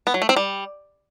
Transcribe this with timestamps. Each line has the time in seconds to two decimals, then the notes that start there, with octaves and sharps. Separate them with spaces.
0.07 B3
0.14 F#3
0.22 A3
0.29 C4
0.36 G3